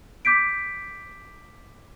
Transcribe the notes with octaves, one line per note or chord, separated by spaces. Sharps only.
D6 G6 B6 D7